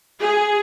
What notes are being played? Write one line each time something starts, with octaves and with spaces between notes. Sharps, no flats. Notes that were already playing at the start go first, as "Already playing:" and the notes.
G#4